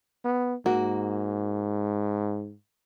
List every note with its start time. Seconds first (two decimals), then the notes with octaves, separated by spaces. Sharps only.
0.25 B3
0.66 G#2 A#3 F#4